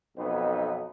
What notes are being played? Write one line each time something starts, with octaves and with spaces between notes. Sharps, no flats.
B1 F2 B3 D#4 B4